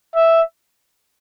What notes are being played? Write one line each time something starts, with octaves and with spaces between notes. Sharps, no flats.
E5